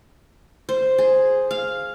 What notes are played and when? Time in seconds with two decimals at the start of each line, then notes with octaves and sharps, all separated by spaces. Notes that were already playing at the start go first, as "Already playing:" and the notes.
0.69 C5
0.98 G#4
1.51 F5